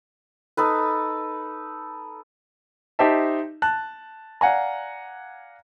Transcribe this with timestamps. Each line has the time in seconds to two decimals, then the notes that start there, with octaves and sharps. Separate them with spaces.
0.57 D#4 A4 B4
2.99 D#4 G4 C5 D#5 E5 A5
3.62 A5 F#6
4.41 D5 F5 F#5 G#5 A#5